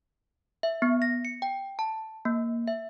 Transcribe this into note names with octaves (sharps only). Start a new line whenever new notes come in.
E5
B3
A#6
C#7
G5
A5
A#3
E5